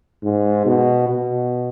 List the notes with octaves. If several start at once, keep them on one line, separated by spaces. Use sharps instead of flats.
G#2
B2
B2